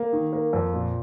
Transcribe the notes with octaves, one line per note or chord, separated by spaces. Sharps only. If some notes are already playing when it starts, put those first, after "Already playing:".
Already playing: A#3
D#3
A#3
F2
A#2